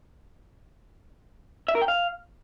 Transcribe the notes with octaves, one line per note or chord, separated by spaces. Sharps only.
E5
A#4
G5
F5